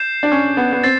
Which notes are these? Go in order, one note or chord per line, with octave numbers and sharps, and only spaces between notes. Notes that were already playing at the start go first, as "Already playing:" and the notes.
Already playing: G6 C7 E7
D4
C#4
B3
B3
C4 A6 C7